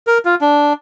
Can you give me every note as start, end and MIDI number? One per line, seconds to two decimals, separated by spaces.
0.07 0.18 70
0.25 0.35 65
0.41 0.73 62